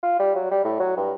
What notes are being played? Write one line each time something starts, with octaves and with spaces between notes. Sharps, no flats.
F4
G3
F#3
G3
A2
F#3
G2